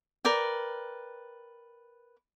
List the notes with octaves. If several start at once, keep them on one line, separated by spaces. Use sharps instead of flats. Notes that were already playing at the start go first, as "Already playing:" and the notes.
A#4 B4 D5 G5